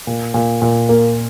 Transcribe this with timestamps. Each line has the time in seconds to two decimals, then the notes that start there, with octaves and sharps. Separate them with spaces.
0.07 A#2
0.34 A#2
0.62 A#2
0.89 A#3